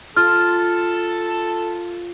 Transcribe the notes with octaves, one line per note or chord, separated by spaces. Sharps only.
F4 A4 A5 F6